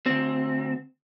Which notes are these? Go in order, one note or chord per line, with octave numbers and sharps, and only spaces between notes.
D2 C4